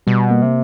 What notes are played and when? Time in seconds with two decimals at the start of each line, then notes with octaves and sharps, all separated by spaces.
0.07 B2 G3
0.31 A#3
0.42 C3